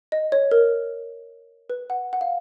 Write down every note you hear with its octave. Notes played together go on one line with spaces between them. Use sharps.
D#5
C#5
A#4
B4
F#5
F#5
F5